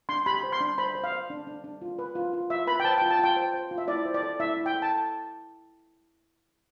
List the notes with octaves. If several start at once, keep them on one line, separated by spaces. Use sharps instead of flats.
D4 C6
G4 B5
C5
C6
D4
C5 B5
C5
F5
C5
D4
D4
D4
F4
B4
F4
F4
F4 E5
B4 B5
G5
C5 A5
G5
F4
A5
F4 G5
C5
C5
F4
E5
E4 D5
C5
D5
A4
E4 E5
E4
G5
A4
A5